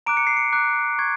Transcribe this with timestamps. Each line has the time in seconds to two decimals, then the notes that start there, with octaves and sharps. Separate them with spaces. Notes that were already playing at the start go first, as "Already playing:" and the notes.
0.06 A#5 D6 F#6 D7
0.17 C#7
0.27 C7
0.37 C#7
0.52 A#5 D6 F#6
0.99 C#6 G#6